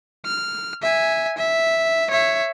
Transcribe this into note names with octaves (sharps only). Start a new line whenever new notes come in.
F6
E5 G#5
E5
C#5 E5